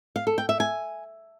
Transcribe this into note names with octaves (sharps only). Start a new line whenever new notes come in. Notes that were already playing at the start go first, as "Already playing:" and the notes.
F5
A4
G5
E5
G#5